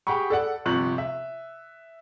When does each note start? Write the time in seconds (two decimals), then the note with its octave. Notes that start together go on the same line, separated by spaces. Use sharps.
0.07 G4 G#4 F#5 G5 B5 C#6
0.30 A4 D5 F#5
0.66 G1 C3 F3 C#6 F#6 F#7
0.98 E5